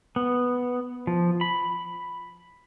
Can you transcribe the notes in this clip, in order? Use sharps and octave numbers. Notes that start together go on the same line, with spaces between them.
B3
F3
B5